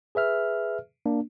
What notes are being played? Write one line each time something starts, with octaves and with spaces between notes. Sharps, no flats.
G#4 B4 E5 F6
A#3 D4